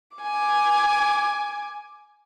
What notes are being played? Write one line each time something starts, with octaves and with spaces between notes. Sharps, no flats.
G#5 D6